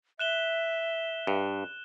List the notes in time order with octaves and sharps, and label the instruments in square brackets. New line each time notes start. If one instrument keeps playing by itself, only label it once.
[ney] E5 [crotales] F#6 E7 G7
[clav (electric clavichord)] G2